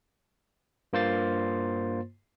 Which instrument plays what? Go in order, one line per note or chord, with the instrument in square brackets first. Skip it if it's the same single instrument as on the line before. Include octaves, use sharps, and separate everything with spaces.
[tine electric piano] G2 A#3 F4 C5 C6 A6